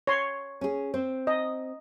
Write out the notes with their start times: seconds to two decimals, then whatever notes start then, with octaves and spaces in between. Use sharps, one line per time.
0.07 C#5 C6
0.61 C#4 G#4
0.94 C4 C5
1.27 D#5